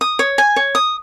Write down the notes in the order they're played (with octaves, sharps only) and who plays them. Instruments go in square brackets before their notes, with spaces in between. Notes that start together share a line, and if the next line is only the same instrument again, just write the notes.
[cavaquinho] D#6
C#5
G#5
C#5
D#6